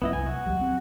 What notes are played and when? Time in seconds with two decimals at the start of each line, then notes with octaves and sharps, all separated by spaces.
0.02 B1 F#2 B3 E4 D#5
0.13 C2 G#5
0.27 F#4
0.46 D#2 F#3 G3
0.61 C4